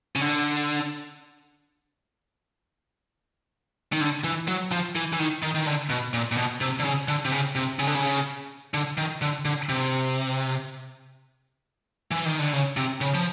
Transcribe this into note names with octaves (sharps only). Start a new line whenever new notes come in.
C#3
D3
D#3
D3
E3
F#3
F3
E3
E3
D#3
D#3
D#3
D3
B2
A#2
A#2
B2
C3
D3
C#3
D3
C3
C#3
C3
C#3
D3
C#3
D3
D#3
D3
D3
C3
E3
D#3
D3
C#3
C3
C#3
F3